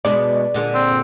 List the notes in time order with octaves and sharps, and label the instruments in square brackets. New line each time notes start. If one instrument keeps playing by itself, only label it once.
[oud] B2 G#3 D4 [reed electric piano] D5
[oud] A#2 D3 G#3
[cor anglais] C4